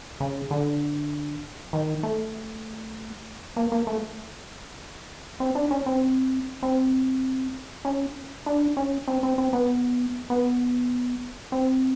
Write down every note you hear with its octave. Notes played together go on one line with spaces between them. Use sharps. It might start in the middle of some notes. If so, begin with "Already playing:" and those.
C#3
D3
D#3
A3
A#3
A#3
A3
C4
D4
C#4
C4
C4
C#4
D4
C#4
C4
C4
C4
B3
B3
C4